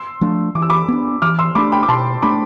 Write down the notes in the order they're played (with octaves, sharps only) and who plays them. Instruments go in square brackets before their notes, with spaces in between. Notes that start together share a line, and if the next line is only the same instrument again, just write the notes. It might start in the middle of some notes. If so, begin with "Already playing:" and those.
Already playing: [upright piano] C6 E6
[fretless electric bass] F3 A3 D4
[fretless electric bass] E3 [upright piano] D6
[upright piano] E6
B5 D6
[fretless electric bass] B3 D4
[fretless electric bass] E3 [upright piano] D6 F6
[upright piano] C6 E6
[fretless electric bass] A3 D4 [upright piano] B5 D6
[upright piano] G5 B5
D6
[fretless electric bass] B2 [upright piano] A5 C6
[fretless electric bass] A3 D4 [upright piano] B5 D6